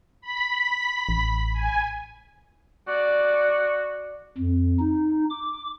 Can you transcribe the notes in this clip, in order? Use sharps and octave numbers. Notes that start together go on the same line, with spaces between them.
B5 B6
A1
G#5
F#4 D5
F2
D#4
D6